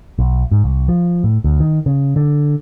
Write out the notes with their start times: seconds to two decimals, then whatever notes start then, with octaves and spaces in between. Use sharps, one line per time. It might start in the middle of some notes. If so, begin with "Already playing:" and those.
0.19 B1
0.52 G#2
0.64 C2
0.88 F3
1.24 A2
1.44 D2
1.60 D#3
1.86 C#3
2.16 D3